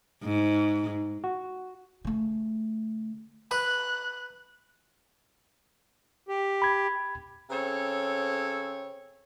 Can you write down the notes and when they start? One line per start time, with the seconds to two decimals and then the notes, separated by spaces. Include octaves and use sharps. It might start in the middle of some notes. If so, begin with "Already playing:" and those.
0.23 G#2
1.24 F#4
2.05 C#3 A3
3.51 B4 F#6
6.28 G4
6.62 B5 G#6
7.50 C#3 C4 A4 C#5